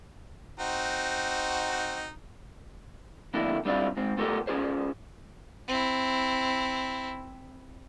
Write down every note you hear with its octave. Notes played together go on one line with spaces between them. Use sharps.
C4 D#4 F#4
F2 D3 A3 A#3 E4
G3 B3 C4 D4 E4 F4
G#2 C4
A3 B3 F4 G4 A4 A#4
C#4 F4 G#4 C5
C4 E4